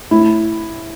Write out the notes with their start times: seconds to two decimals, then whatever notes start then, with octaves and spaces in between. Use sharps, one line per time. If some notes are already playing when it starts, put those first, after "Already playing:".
0.11 A2 E4